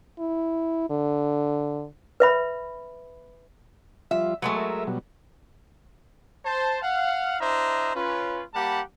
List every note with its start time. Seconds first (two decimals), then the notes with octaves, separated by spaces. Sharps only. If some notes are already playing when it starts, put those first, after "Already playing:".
0.19 E4
0.90 D3
2.20 B4 E5 B5
4.11 F3 G3 F4 E5
4.42 F#3 G#3 A3 B4
4.56 A#4 E5
4.87 B2 F#3 G3
6.44 C5 A5
6.82 F5 F#5
7.40 D4 E4 C5 D#5 E5 A#5
7.95 C#4 F4 B4
8.54 G3 A#3 G4 F#5 A5 B5